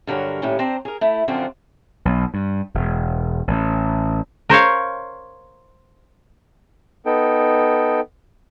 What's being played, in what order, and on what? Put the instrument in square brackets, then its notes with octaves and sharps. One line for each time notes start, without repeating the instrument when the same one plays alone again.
[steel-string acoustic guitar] G2 D3 F#3 A#4 C#5
D#2 A2 G3 C#4
C4 D4 C5 A#5
G#4 A#4
A3 E4
F#2 D3 F3 C4 F4 F#4
[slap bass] B1
G2
E1
A1
[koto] A#4 C5 C#5 F5
[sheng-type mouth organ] B3 D#4 A4 G5